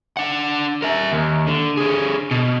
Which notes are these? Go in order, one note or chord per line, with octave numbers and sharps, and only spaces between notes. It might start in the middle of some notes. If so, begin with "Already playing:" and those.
D4 F#5
A#4 E5
D#2
D3
D3 G#4
B2